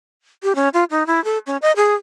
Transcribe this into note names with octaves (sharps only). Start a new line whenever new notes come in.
G4
C#4
F4
D#4
E4
A4
C#4
D#5
G#4